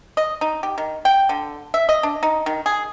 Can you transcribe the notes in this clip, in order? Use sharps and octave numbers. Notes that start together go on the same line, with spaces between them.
D#5
D#4
G4
D#3
G5
D3
E5
D#5
D4
D#4
D#3
G#4